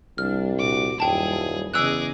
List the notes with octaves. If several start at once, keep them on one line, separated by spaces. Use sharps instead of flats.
C2 G3 D4 F6
A#2 F#4 D6
D#1 F#2 G3 E4 G#4 G5 A5
E2 C#3 G#4 D#5 D6 E6 F#6